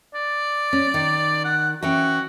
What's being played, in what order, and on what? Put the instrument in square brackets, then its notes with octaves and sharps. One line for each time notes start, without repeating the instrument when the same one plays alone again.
[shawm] D5
[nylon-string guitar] C#4
D#3
[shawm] F#5
[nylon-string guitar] E3 C#4 G5 [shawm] F#4